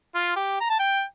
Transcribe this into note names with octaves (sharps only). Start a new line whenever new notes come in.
F4
G4
A#5
A5
G5